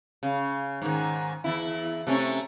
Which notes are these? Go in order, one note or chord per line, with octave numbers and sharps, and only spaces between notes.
C#3
G#2 D#3
E2 E4
C3 A3 C#4